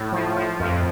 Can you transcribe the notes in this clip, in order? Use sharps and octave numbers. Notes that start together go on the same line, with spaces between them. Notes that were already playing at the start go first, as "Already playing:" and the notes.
Already playing: A2
F3
F3
F2